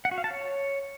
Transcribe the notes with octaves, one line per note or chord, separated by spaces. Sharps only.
F#5
F#4
F5
A5
C#5